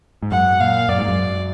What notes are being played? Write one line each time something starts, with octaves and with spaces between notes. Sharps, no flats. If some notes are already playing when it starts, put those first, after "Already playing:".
G#2
F#2 F#5
A#2 F5
F#2 D5
G#2
F#2